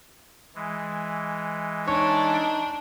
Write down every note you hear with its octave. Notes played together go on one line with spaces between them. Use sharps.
E3 G#3
D4 D#4 C#5